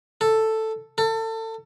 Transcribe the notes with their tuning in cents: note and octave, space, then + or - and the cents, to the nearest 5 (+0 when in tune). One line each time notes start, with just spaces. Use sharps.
A4 +5
A4 +30